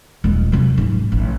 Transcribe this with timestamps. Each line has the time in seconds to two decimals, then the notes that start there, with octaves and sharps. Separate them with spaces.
0.24 D#1 G#3
0.52 F#2 C3
0.77 G#2
1.12 A1